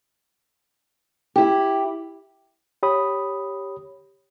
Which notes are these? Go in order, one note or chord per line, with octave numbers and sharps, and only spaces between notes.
E4 G4
G4 C#5 B5 D#6